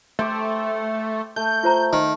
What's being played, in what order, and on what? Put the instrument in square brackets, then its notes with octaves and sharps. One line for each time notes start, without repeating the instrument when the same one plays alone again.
[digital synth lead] A3 [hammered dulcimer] C5 G5 D6
[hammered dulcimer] A3 [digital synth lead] G6
[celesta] F4 C5 A#5
[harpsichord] D#3